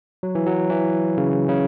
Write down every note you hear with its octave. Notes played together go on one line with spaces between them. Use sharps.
F#3
E3
F#3
E3
C#3
C#3